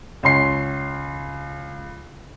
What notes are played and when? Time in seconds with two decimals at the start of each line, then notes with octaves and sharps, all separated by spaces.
0.23 C#2 C#4 C6 C7